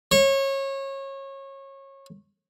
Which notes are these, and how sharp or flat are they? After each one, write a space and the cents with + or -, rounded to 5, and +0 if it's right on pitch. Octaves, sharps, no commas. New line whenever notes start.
C#5 -25